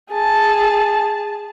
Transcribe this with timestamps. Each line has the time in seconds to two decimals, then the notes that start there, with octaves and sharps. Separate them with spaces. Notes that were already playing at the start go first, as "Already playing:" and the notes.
0.11 G#4 A5